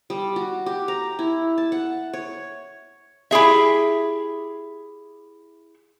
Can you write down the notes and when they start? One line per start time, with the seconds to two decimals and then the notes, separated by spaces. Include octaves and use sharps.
0.10 G3
0.36 F#4
0.66 G4
0.88 A#5
1.19 E4
1.58 A5
1.72 F#5
2.13 C#5
3.31 E4 G4 G#4 E5